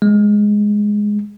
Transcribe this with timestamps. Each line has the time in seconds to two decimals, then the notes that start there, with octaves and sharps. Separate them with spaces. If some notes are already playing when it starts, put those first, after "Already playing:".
0.02 G#3